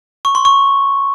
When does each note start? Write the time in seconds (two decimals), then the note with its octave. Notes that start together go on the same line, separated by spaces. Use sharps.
0.25 C#6
0.35 C6
0.45 C#6